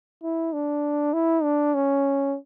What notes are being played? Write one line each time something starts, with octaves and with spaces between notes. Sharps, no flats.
E4
D4
E4
D4
C#4